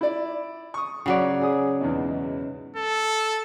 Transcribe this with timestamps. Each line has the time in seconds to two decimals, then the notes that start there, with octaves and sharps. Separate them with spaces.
0.01 E4 D5
0.74 C#6 D#6
1.06 C#3 F#3 D5
1.41 G#4 D#6
1.81 E2 G#2 B2
2.76 A4